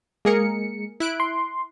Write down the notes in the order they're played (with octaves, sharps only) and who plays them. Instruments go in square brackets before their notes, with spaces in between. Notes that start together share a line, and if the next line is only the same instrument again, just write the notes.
[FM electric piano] G#3 C#7 [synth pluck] A#3 G#4 A#4
[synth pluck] E4 F#6 D7
[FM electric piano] C6